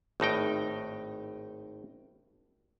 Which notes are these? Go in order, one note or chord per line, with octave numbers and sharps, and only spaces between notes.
G#1 A2 D#4 G5